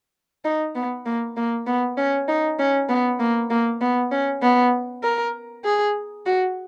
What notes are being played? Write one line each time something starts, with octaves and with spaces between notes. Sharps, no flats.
D#4
B3
A#3
A#3
B3
C#4
D#4
C#4
B3
A#3
A#3
B3
C#4
B3
A#4
G#4
F#4